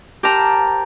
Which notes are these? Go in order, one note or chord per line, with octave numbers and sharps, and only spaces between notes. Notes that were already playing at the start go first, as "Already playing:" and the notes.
G4 A#4 C5 G5 A5 A#5